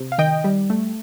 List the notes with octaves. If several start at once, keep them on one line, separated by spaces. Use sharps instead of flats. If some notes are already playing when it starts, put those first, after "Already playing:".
Already playing: C3
F5
D#3 D#5 G5
G3
A3